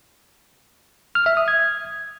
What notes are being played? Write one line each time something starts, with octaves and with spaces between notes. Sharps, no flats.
F6
E5
D#6
G#6